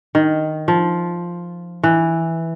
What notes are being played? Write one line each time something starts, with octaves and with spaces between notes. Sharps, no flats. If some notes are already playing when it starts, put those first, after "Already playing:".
D#3
F3
E3